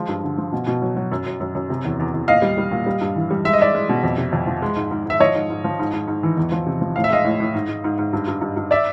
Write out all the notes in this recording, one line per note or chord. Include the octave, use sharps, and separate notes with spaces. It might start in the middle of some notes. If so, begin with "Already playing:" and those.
Already playing: F3 G#3
G2
D3
F3
B2
B2
F#3
F#3
F#2
F#2
F#2
F#2
C3
E2
E2
E2
A#2 D#5 F5
G3
G3
A#2
G3
G2
E3
G3
G#3 E5
D#5
G#3 D5 E5
G#3
B2
F2
C3
F2
F3
G#3
G#2
G#2
G#2 E5
F3 C#5 D#5
G#2
G#2
F3
G#2
G#2
G#2
E3
E2
F3
C3
F3
A2 F5
E5
G#3 D#5 F5
A2
A2
G#2
G#2
G#2
G#2
G2
G2
G2
G2
D5 E5